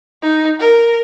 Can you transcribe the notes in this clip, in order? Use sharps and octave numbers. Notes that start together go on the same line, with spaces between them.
D#4
A#4